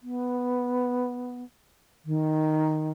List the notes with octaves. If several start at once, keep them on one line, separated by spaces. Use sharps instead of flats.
B3
D#3